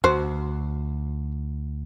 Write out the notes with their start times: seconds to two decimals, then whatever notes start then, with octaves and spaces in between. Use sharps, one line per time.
0.04 D2 F#4 C5